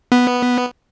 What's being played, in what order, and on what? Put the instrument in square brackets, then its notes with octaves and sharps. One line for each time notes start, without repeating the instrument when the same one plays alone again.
[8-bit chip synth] B3